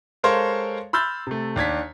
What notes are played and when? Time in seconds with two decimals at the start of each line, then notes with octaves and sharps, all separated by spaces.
0.23 G#3 A4 A#4 C5 C#5 F5
0.93 B5 C6 E6 F6 G6 A6
1.27 C3 A3
1.56 D#2 D4 G#6 B6